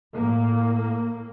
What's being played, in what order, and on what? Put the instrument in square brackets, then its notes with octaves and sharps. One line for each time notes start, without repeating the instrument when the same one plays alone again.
[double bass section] A2 A#3